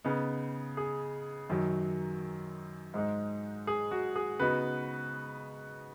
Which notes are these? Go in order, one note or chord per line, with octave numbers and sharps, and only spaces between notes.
C#3 B3 D#4
G#4
F#2 D#3 F#3
G#2 G#3 D#4
G#4
F#4
G#4
C#3 B3 D#4 F#4 B4